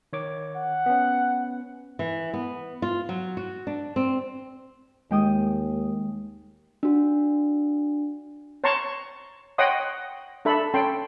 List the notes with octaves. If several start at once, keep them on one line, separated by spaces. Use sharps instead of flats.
D#3 C#5 D6
F#5
B3 C#4
E3
B3
F4
F#3
F#4
D4
C4
D#2 G#3 G5 D#6
D4 F#4
C#5 A5 A#5 C6 C#6
C#5 D#5 F#5 G5 C6 D#6
D4 A4 E5 B5
C#4 A4 G5 C6